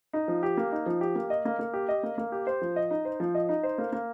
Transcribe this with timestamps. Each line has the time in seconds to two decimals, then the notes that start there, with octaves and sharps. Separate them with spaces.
0.13 D#4
0.28 F3
0.43 G4
0.57 A#3
0.72 D#4
0.86 F3
1.01 G4
1.15 A#3
1.30 D#5
1.45 A#3
1.59 A#3
1.74 G4
1.89 D#5
2.03 A#3
2.18 A#3
2.32 G4
2.47 C5
2.62 F3
2.76 D#5
2.91 D#4
3.05 C5
3.20 F3
3.35 D#5
3.49 D#4
3.63 C5
3.78 A#3
3.93 A#3